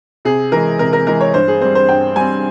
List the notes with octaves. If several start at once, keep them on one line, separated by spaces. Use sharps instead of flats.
C3 G#4
E3 G#3 A#4
C3 A#4
A#4
E3 G#3 A#4
C#5
G2 C5
G#4
G3 C4 C5
C5
G2 G5
G3 C4 G#5